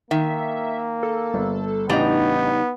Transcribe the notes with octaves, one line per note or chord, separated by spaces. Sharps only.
D#3 A#3 E5
A4
G1
A1 C#3 G3 B3 D4 D#4 D#5 A#5